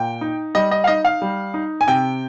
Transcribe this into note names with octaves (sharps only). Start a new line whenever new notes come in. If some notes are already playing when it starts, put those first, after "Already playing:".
Already playing: A#2 G5
D#4
G3 D#5
D#5
F5
D#4 D#5
F5
G3
D#4
G#5
C3 G5